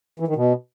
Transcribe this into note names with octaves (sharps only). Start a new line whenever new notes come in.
E3
D#3
B2